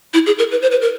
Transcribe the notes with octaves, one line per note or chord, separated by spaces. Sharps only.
E4
G#4
A#4
B4
C5
B4
A#4